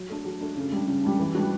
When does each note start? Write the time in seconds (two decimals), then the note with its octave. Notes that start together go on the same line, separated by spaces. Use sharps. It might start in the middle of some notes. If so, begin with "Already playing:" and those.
Already playing: F#3
0.09 A3 D4
0.25 F#3
0.41 A3 D4
0.57 C#3
0.72 G3 D4
0.88 C#3
1.03 G3 D4
1.19 E3
1.35 G3 D4 F#4